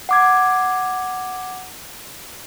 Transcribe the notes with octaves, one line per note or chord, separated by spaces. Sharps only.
F#5 D6 G#6